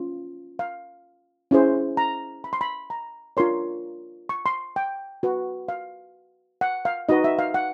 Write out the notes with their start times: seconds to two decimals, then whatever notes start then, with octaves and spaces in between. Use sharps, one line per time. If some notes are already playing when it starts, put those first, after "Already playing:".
Already playing: C#4 F4
0.59 F5
1.51 C#4 E4 G#4 C5
1.97 A#5
2.44 B5
2.53 C6
2.61 B5
2.90 A#5
3.37 D4 F4 A#4 C#5 C6
4.29 C#6
4.46 C6
4.76 G5
5.23 F#4 B4
5.68 F5
6.61 F#5
6.85 F5
7.09 D#4 F#4 B4 D#5
7.24 E5
7.39 F5
7.54 F#5